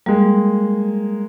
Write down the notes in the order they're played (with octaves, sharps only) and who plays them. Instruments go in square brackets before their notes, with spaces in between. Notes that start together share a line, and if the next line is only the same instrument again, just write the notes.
[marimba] G3 [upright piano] G#3 A#3